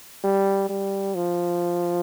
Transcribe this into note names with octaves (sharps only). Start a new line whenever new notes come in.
G3
G3
F3